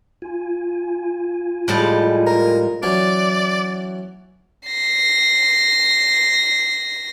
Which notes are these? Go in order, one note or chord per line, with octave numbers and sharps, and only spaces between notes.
F4 G#5
A2 F3 G3 G#3 A5
A#4
E3 F#3 C#4 D5
A#6 C7